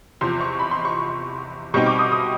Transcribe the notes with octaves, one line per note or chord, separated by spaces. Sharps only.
E2 C3 F3 C6
C#6
B5
C6
C#6
B2 G3 C4 D#4 C#6
D6
D#6
D#6